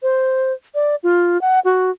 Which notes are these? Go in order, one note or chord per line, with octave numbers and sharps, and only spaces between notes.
C5
D5
F4
F#5
F#4